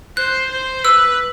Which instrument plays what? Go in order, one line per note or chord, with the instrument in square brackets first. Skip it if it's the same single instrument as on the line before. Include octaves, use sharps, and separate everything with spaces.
[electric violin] C5 [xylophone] F#6
[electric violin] C5
[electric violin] B4 [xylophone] E6